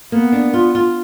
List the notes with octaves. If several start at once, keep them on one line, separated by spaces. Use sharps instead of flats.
A#3 B3
D4
F4
F4